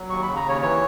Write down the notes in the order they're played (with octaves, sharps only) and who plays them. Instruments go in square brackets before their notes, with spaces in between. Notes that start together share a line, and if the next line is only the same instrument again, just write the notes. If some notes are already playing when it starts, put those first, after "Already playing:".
Already playing: [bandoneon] F#3
D#2 C#6
C#3 B5
A#5
D#2 C#5
E3 C#5